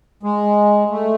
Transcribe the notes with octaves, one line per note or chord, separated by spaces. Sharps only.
G#3
A3